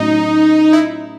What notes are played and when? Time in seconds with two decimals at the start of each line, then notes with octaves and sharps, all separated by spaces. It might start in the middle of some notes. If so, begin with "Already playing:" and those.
Already playing: A2 F#3 C#4 D#4
0.73 E4